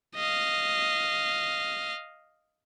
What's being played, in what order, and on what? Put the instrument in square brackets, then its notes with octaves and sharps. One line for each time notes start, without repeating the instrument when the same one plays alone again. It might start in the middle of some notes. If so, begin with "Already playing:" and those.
[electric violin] D#5 F5